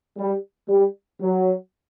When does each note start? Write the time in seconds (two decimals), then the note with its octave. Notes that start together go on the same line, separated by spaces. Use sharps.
0.17 G3
0.69 G3
1.20 F#3